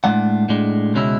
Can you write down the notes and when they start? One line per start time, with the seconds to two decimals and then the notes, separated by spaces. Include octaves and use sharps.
0.04 A2 G#3 D4 F#5
0.49 A2 G#3 D4
0.94 C#2 B2 G#3 C#4 E4